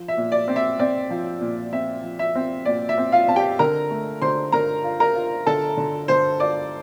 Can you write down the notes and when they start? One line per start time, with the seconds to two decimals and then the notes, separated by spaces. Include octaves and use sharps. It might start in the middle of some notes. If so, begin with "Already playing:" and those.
Already playing: F3
0.08 E5
0.17 A#2
0.32 D5
0.48 C4
0.56 E5
0.79 C4 D5
1.10 F3
1.41 A#2
1.73 C4 E5
2.03 F3
2.19 E5
2.35 C4
2.65 A#2 D5
2.89 E5
2.98 C4
3.12 F4 F5
3.28 C4 A5
3.36 G4 G5
3.59 D3 A#4 A#5
3.91 A3
4.22 D3 C5 C6
4.52 D3 A#4 A#5
4.84 F4
5.00 A#4 A#5
5.15 F4
5.46 D3 A4 A5
5.77 D3
6.08 D3 C5 C6
6.40 F4 D5 D6